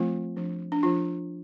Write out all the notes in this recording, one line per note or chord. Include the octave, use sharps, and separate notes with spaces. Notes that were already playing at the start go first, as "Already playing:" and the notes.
Already playing: F3 A3 C4 F4
F3 D4
D4
F3 D4 F4